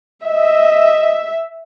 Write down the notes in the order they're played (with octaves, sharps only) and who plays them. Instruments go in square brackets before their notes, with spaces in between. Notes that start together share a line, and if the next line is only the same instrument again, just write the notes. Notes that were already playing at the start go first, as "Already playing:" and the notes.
[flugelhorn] D#5 [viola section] E5